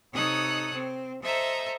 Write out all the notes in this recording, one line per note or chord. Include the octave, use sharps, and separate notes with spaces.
C3 D#4 A4 C#5 D#6 F#6
C4
A4 C5 D#5 E5 A#5